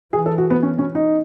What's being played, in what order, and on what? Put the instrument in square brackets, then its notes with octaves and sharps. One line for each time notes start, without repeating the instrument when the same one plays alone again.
[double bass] E3 [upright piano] G#4
[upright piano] A4
F#4
B3
C#4
C#4
D#4